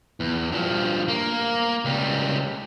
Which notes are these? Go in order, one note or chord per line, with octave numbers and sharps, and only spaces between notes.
E2
G2 F3
A#3
C#2 G3